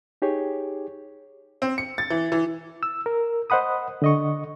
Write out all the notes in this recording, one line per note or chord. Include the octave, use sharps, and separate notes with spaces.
D#4 G4 G#4 C#5
C4
C#7
A6
E3
E3
E6
A#4
C5 D#5 F#5 B5 D#6
D3 D#5 C#6